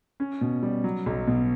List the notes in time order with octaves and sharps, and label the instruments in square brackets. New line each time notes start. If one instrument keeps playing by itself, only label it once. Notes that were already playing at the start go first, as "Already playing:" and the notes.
[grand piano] C#4
B2
G3
F#3
B1
B2